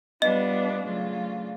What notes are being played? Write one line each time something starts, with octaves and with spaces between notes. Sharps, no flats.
G3 B3 D4 F4 D#5
C#3 F#3 A3 D4 F4